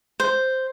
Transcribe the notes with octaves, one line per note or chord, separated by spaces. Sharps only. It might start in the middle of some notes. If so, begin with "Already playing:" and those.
C5